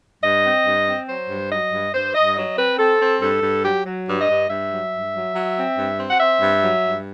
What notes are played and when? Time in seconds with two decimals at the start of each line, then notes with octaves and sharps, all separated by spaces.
0.24 G2 D#5
0.44 C4
0.66 G2
0.88 C4
1.09 F#3 C5
1.30 G2
1.51 F#3 D#5
1.73 G2
1.94 G2 C5
2.15 G2 D#5
2.37 F#3 D#5
2.58 C4 B4
2.79 C4 A4
3.01 C4
3.21 G2 A4
3.43 G2
3.65 F#3 G4
3.86 F#3
4.08 G2
4.21 D#5
4.29 G2
4.50 G2 E5
4.71 F#3
4.92 G2
5.14 F#3
5.35 F#3
5.57 C4
5.78 G2
5.98 C4
6.10 F#5
6.20 C4 E5
6.42 G2
6.63 F#3
6.84 G2